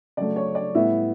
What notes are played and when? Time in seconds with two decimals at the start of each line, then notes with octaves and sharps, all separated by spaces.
0.17 C#3 F#3 A3 D5
0.36 C#5
0.55 D5
0.75 A2 G3 B3 E4 E5